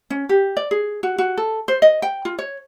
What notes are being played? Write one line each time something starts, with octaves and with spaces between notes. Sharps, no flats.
C#4
G4
D5
G#4
F#4
F#4
A4
C5
D#5
G5
F4
C#5